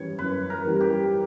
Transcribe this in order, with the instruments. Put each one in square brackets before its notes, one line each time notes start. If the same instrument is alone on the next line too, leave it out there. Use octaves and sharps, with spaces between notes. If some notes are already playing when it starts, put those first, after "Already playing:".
Already playing: [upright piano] F#2 E3 G3 [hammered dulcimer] C#5
[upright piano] F#2 [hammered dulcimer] B4
[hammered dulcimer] A#4
[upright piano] E3 G3
[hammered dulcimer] G4